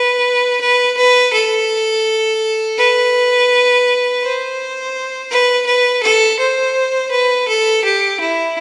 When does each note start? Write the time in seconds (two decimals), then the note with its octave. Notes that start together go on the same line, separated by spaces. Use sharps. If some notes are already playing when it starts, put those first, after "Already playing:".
Already playing: B4
0.61 B4
0.97 B4
1.33 A4
2.78 B4
4.22 C5
5.31 B4
5.67 B4
6.03 A4
6.40 C5
7.12 B4
7.48 A4
7.84 G4
8.20 E4